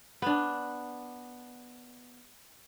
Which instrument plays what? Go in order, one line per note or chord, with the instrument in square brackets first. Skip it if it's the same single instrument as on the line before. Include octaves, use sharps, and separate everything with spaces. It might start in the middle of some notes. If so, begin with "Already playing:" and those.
[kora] B3 D4